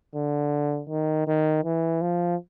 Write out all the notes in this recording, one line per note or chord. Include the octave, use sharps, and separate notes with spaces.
D3
D#3
D#3
E3
F3